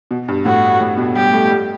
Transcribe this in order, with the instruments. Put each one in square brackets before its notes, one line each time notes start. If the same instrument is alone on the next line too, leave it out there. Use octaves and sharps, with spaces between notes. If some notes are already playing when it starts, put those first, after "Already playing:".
[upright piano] B2
G2
[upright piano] A2 [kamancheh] F#4
[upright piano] A2
B2
[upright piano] G3 [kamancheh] G4
[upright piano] A3
G3